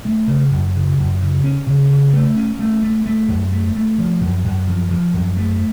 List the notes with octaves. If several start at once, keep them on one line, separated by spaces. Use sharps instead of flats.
A3
C#3
F#2
C#3
F#2
C#3
C#4
C#3
C#3
A3
C#4
A3
A3
A3
F#2
A3
A3
F3
F#2
F#2
F3
F3
F#2
A3